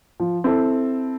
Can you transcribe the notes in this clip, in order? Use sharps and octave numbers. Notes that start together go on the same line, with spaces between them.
F3
C4 E4 A4